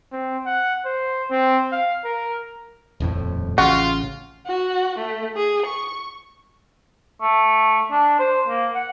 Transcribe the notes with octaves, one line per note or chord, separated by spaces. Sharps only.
C4
F#5
C5
C4
F5
A#4
D#1 F2 A2
A1 C#3 F4 F#4
F#4
A3
G#4
C#6
A3
D4
C5
A#3
F#5